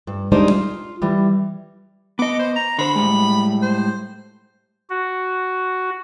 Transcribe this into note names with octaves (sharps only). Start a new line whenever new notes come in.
G2
G3 G#3 D4 D#4 C5 D5
F4
E3 G3
B3 D#5 D6
C5
A#5
D3 C5 B5
A2 G3 G#3
C5
F#4